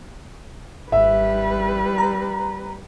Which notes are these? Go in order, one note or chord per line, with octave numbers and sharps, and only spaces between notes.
G#1 G3 B4 E5
A#5